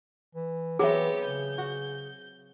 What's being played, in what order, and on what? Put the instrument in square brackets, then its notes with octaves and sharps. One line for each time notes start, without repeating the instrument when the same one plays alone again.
[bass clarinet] E3
[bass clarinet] E3 [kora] F#3 C4 [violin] B3 G4 [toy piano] G#4 E5
[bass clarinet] C#3 [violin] G6
[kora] F#4